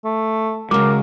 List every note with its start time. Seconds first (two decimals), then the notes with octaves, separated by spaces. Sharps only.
0.05 A3
0.71 C#3 F#3 G#3 A#4 D6